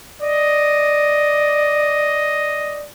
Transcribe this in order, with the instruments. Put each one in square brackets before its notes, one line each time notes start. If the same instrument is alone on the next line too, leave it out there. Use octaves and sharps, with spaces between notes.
[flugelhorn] D5 [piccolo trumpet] D#5